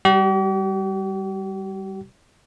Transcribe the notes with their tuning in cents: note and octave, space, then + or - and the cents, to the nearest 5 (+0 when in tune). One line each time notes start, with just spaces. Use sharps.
G3 +0 G4 -45